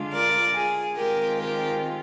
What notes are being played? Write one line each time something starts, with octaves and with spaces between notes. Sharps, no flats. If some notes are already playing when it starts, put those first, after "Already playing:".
Already playing: D3 G#3 D4 F4
A#4 D5
G#4
D#3 G#3 C4 F4 G4 A#4
G4 A#4